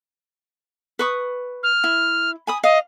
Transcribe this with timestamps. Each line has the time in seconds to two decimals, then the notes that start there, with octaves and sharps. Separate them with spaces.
0.99 B4 C#6 D#6
1.63 F6
1.84 E4
2.47 G#5 B5 D#6
2.64 D#5 F5